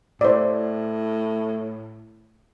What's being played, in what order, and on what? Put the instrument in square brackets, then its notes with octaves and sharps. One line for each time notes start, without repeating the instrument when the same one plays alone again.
[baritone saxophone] A2 [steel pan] C5 D5